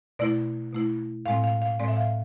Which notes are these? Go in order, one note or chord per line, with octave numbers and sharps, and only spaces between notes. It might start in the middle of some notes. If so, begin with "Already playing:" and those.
B2 A3 E4 D5
B2 A3 E4
A2 G#3 C4 F5
F5
F5
A2 G#3 C4 D5
E5
F5